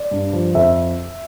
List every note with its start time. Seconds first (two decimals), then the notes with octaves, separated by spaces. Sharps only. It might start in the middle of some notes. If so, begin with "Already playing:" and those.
Already playing: D5
0.11 G2
0.33 F3
0.55 F2 E5